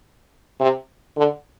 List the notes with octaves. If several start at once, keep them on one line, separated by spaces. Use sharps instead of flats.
C3
D3